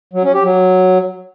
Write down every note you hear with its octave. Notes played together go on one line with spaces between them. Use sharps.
F#3
C#4
G4
F#3